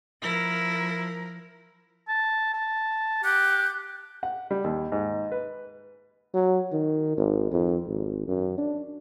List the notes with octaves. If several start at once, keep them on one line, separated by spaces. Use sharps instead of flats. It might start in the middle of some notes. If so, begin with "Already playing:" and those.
F3 E4 A#4
A5
A5
G4 F#6
F#5
G3
D#2
G#2
B4
F#3
D#3
G#1
F2
G#1
F#2
D4